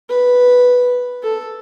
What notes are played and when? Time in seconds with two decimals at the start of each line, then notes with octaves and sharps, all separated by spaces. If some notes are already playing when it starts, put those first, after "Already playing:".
0.09 B4
1.23 A4